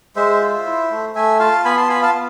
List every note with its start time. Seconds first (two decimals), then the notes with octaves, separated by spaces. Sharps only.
0.16 G#3 C5 E5
0.41 F4
0.66 E4
0.90 A3
1.15 A3 E5 G#5
1.39 F4 F5 A5
1.65 B3 G#5 B5
1.77 A5 C6
1.89 F4 G#5 B5
2.02 F5 A5
2.14 B3